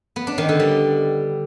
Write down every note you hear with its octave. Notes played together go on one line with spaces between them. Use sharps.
B3
D4
D#3
D3
G3